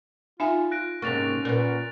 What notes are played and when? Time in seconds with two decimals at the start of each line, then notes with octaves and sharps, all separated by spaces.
0.40 D#4 F4 E5 G#5
0.71 F4 F#6 A#6 D7
1.02 G#2 C3 A#3 C#4 C#6 A6 F7
1.45 A#2 B3 A#4